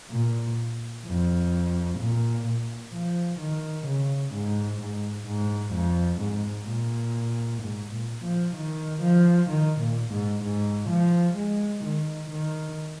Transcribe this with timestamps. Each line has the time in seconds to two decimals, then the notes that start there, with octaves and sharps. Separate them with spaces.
0.12 A#2
1.06 F2
1.99 A#2
2.46 A#2
2.94 F3
3.40 D#3
3.87 C#3
4.33 G#2
4.81 G#2
5.27 G#2
5.74 F2
6.21 G#2
6.68 A#2
7.62 G#2
7.93 A#2
8.24 F3
8.56 D#3
9.03 F3
9.50 D#3
9.80 A#2
10.12 G#2
10.43 G#2
10.90 F3
11.36 G#3
11.84 D#3
12.30 D#3